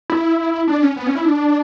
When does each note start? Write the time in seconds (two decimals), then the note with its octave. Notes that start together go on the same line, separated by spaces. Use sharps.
0.10 E4
0.68 D4
0.82 C#4
0.96 B3
1.06 C#4
1.15 E4
1.25 D4